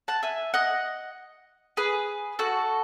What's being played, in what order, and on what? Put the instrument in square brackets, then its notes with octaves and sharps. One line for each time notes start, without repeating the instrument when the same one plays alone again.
[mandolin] F#5 A5
E5 G#5
D#5 F#5
G#4 B4
F#4 A4